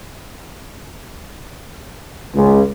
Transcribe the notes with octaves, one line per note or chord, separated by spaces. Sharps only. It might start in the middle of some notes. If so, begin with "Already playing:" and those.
C#2